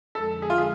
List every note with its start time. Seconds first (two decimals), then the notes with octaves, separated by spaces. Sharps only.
0.15 F2 D3 G#3 A4
0.42 G#4
0.50 F4
0.58 G#4